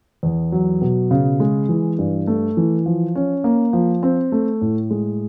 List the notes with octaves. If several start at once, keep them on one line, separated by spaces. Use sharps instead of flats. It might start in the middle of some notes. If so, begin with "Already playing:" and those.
E2
F#3
B2
C#3
G#3
E3
G2
A3
E3
F3
C#4
A#3
F3
C4
A3
A2
G#3